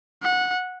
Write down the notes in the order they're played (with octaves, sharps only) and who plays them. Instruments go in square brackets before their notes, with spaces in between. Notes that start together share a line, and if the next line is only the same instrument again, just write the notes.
[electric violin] F#5